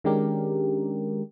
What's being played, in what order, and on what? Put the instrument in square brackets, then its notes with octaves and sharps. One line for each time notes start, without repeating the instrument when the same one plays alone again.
[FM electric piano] D#3 G#3 C#4 D4 G4 A#4